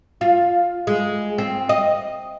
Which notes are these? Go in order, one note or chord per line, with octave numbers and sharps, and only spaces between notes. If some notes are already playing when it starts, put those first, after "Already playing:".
F4
G#3
C4
D#5